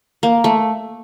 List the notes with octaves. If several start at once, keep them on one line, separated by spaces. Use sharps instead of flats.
A#3
A3